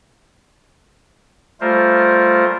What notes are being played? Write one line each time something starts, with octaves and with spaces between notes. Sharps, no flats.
G3 A3 F4 A#4 C5